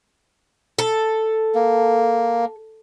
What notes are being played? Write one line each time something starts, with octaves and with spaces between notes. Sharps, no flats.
A4
A#3